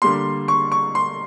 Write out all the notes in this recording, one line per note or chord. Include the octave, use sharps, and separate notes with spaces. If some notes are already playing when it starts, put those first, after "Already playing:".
D3 G3 A#3 C6
C#6
C#6
C6